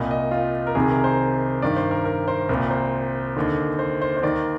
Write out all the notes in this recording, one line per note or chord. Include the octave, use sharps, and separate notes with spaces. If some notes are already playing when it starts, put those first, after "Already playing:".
Already playing: C2 A#2 D#5
D#5
F4
A#4
C2 C3 D#3 G#4
A#4
C5
G2 D#3 D5
C5
A#4
A#4
C5
C2 A#2 A#4
C5
D#2 D3
C5
C5
C5
D#2 D#3 D5